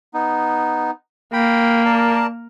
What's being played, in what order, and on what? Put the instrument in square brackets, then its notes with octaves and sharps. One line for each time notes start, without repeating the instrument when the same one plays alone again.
[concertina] B3 D#4
[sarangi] A#3 [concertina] G5 B5
[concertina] A#4 D5 A5